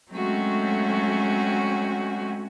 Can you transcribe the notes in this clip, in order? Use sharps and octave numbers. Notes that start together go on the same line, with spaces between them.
F#3 G#3 A3 C4 C#4 F#4